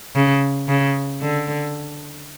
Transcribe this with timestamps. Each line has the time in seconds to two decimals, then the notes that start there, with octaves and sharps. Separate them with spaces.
0.15 C#3
0.68 C#3
1.21 D3